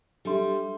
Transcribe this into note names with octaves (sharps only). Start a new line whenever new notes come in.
G3 D4 A4 E5 C6